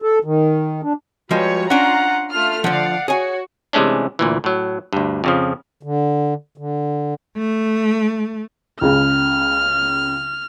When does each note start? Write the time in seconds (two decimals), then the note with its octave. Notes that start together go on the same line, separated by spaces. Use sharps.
0.02 A4
0.24 D#3
0.83 D4
1.31 F3 G3 G#3 F#4 B4 C#5
1.70 C#4 D4 F4 F#5 A#5
2.30 A3 F4 F6
2.64 D3 F3 D5 F5 F#5
3.08 F#4 G#4 C#5 G#5
3.73 C3 E3 G#3 A3 C#4 D4
4.19 D2 A#2 E3
4.44 A2 F#3
4.93 D2 G2
5.24 F2 C#3 F3
5.83 D3
6.58 D3
7.37 A3
8.81 C#2 C#3 F6